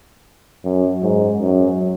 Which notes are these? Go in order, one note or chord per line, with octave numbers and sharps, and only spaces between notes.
F#2
G#2
F#2